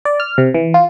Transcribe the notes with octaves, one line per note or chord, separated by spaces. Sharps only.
D5
F6
C3
E3
F4